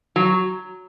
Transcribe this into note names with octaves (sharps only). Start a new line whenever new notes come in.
F#3